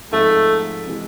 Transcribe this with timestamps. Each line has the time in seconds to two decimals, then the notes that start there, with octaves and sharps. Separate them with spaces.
0.11 G#2 F3 G#3 A3 C4 D#4
0.87 C3 E3 G#3